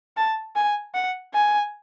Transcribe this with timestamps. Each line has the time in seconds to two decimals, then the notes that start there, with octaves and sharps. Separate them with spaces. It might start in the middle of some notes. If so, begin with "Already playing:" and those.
0.17 A5
0.55 G#5
0.94 F#5
1.34 G#5